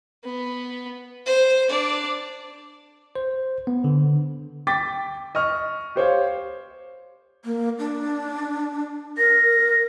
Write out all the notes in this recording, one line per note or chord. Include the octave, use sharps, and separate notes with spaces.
B3
C5
D4 D5
C5
B3
D3
G5 D6 A6 B6
D#5 C#6 F6
G4 C5 C#5 F5
A#3
D4
A#4 A#6